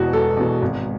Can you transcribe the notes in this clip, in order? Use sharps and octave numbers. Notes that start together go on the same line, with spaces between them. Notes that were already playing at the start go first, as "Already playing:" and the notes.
Already playing: E1 E2 B2 F#4
E1 A4
E2 B2
G#1